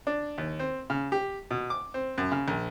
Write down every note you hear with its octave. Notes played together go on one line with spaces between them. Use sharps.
D4
D#2
C4
C#3
G4
B2
D6
C4
F#2
C#3
A#1